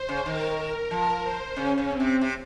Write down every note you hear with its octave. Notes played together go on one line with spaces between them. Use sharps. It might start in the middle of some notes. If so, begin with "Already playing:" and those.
Already playing: C5
C#3
D#3 A#4
F3 A#4
C5
C#3 C#4
C#3
C4
C3
C3